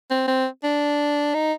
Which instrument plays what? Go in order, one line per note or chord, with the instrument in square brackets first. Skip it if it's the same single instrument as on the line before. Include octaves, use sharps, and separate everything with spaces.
[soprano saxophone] C4
C4
D4
D#4